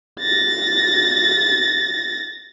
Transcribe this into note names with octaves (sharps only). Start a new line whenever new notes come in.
A6 A#6